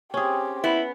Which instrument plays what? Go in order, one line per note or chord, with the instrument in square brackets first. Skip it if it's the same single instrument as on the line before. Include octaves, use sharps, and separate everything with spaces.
[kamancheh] C4 G4 [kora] C#4 G#4
[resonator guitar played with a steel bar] B3 [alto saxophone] E4